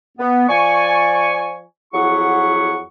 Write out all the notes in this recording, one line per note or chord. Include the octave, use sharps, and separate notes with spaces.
B3
F3 D5 G#5 C#6
F2 F#3 E4 G#4 F#5 C#6